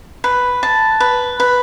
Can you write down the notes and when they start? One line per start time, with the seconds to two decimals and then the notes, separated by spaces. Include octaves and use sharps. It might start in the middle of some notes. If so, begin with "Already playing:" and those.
0.24 B4
0.63 A5
1.00 B4
1.40 B4